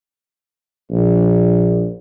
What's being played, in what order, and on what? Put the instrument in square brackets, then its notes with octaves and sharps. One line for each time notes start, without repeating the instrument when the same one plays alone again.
[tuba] A#1